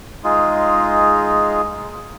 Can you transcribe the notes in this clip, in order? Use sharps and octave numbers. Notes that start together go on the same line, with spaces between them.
G#3 D#4 F4 G#4